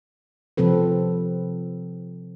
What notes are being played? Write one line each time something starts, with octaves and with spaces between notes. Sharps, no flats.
C3 F3 C4 A4 B4